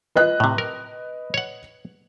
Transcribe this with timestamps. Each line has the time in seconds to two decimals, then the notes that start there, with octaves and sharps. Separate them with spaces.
0.16 B4 D#5 F#6
0.40 A2 C3
0.58 A#4
1.34 C#5 F#5